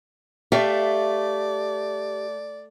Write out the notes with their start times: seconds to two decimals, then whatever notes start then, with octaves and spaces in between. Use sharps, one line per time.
0.52 A3 G4 D5 E5 F5